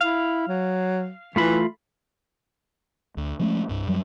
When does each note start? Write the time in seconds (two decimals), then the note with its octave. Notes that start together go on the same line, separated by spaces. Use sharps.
0.01 E4 F5
0.48 F#3
1.36 E3 A3 F4 B5
3.17 D2
3.40 F3 G#3 A3 C#4
3.69 C2 G2
3.88 F#2 F#3 G3